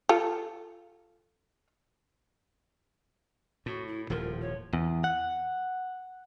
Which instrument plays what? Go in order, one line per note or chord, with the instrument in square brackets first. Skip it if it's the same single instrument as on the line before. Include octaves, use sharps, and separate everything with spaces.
[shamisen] F4 A4
[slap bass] A2 [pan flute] F#4
[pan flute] E4
[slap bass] D#1 A2 F3 [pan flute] A#4
[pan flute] C#5
[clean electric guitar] E2
F#5